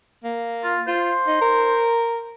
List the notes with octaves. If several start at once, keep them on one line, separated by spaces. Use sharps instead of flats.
A#3
F4
F4 C5
D#4
A#4